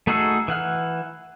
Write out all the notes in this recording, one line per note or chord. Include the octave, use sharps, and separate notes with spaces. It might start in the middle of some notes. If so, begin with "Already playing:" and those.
A3 D#4 F#4 G#4 E6
E3 F#5 F6